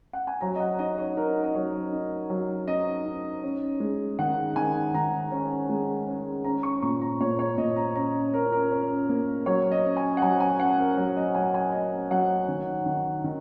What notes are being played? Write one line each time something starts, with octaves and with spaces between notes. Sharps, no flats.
F#5
G#5
F#3 A#5
D#5
F#5
D#4 D#5
C#5
D#4 A#4
D#5
F#3 C#5
D#4
F#3
D#4 D#5
D#4
C#4
G#3
D#3 F#5
D#3 G#5
D#3 A#5
C#4
G#3
C#4
C#4 A#5
C#6
A#2 C#6
A#5
A#2 C#5
C#5
A#2 D#5
A#5
C#4 A#5
C#4 A#4
A#4
C#4
A#3
F#3 C#5
D#5
C#4
G#5
F#5
F#3 G#5
G#5
C#4 F#5
A#4
F#3
D#5
F#3 G#5
G#5
C#4 D#5
F#3 F#5
D#3
D#3
D#3